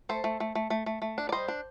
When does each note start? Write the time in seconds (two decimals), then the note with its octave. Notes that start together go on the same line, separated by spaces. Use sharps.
0.09 A3 A4 C5
0.24 A3
0.40 A3
0.55 A3
0.70 A3
0.86 A3
1.02 A3
1.18 D4
1.29 D5
1.32 G3 C5 D#5
1.48 D4